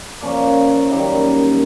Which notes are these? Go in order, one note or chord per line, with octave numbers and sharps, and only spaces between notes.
A#2 F3 A#3 C#4
F#2 D#3 G3